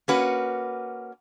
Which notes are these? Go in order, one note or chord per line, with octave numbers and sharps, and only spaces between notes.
A#3 C#4 F#4 B4